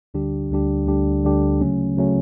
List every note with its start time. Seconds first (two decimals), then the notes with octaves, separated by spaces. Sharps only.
0.14 D2 D3 G3 D4 G4
0.50 D2 D3 G3 D4 G4
0.87 D2 D3 G3 D4 G4
1.24 D2 D3 G3 D4 G4
1.61 C#3 F#3 A3 C#4
1.97 C#3 F#3 A3 C#4